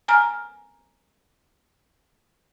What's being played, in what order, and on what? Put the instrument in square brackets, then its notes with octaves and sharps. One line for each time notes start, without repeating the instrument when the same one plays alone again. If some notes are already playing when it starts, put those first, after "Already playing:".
[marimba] G#5 A#5 F6